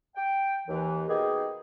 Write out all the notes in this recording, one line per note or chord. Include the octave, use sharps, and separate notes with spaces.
G5
D#2 E3
B2 D#3 A#3 G4 G#4